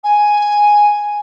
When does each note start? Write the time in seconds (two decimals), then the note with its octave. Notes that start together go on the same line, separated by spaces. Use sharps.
0.03 G#5